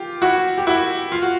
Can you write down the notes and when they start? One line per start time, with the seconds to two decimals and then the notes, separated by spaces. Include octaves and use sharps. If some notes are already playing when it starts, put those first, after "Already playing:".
Already playing: F4 G4
0.22 E4 F#4
0.58 G4
0.67 E4 F#4
1.12 F4
1.22 F#4